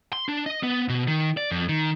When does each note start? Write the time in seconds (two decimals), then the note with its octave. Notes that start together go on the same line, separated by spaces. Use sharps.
0.13 C6
0.29 D4
0.46 D#5
0.63 B3
0.89 B2
1.08 D#3
1.37 D5
1.51 F2
1.69 D#3